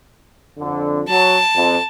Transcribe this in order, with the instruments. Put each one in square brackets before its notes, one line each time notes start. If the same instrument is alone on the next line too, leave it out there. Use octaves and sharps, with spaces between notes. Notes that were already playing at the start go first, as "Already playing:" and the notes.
[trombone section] F2 D3
[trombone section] F#3 [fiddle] A5
[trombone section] F2